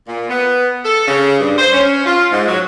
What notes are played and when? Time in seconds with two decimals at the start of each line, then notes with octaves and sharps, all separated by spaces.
0.08 A#2
0.30 B3
0.85 A4
1.07 C#3
1.40 G2
1.58 C5
1.73 C#4
2.06 F4
2.32 G#2
2.48 F#3